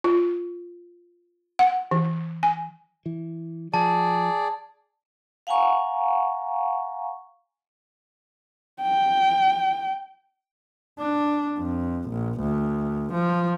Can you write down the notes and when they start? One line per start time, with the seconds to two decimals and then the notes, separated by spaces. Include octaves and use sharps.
0.04 F4
1.59 F#5
1.91 E3
2.43 G#5
3.06 E3
3.74 F3 G#4 D5 A5
5.47 F5 F#5 G#5 A#5 C#6
8.82 G5
10.99 D4
11.59 F2
12.09 A#1
12.40 D2
13.14 F3